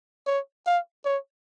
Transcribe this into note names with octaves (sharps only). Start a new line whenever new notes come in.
C#5
F5
C#5